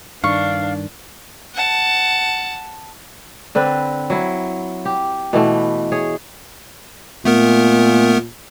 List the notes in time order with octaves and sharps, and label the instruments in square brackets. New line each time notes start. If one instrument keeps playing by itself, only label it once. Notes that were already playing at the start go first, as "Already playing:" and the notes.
[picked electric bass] G2 D#3 [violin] D4 [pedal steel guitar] F5 [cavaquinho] C#6
[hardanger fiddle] F#5 A5
[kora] D3 C4 B4
F#3 E4
G4
B2 E3 A3
G#4 C#5
[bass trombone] A#2 [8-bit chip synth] A3 B3 A#4